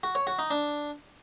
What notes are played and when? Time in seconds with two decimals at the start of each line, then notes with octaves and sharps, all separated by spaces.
0.03 F#4
0.15 C#5
0.27 F#4
0.39 D#4
0.50 D4